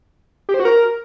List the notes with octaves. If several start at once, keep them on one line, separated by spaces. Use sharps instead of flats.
G4
C5
F#4
A#4